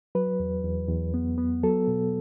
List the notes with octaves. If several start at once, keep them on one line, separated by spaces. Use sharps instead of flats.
F#3 B4
E2
E2
E2
B3
B3
F#3 A4
B2